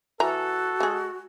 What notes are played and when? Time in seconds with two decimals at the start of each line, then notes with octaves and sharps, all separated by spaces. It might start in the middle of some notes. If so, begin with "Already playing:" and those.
0.20 E3 F#4 A4 A#5
0.80 G#3 G#4